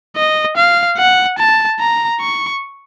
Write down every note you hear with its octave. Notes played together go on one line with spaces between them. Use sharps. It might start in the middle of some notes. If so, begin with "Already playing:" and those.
D#5
F5
F#5
A5
A#5
C#6